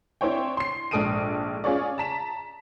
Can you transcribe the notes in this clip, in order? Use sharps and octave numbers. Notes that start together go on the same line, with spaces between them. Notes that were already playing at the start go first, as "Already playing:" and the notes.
C4 D4 E4 C5 C#5 G5
C6 C7
A#1 G#2 A4 D#6 D7 D#7
C#4 F4 G#4 C#5 D5
A5 A#5 B6 E7